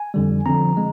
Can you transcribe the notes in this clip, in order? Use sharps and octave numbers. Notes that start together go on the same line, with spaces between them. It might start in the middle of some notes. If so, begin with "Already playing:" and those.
Already playing: G#5
F2 D3 G3
D3 F3 C4 A#5
G#3